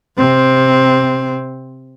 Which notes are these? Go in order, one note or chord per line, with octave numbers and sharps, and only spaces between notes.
C3 C4